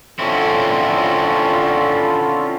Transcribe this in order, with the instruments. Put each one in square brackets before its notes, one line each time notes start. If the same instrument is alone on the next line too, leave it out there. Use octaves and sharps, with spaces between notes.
[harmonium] D3 F4 A4 [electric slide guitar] C4 C#4 E4